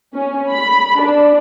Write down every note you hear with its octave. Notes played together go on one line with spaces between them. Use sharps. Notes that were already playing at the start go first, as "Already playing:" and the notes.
C#4
B5
D4